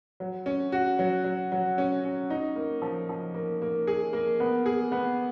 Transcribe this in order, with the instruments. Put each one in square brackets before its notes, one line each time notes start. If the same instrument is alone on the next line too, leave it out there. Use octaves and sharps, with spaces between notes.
[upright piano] F#3
C#4
F#4
F#3
F#3
F#3
C#4
C#4
D#4
A#3
F3
F3
A#3
A#3
G#4
A#3
B3
G#4
B3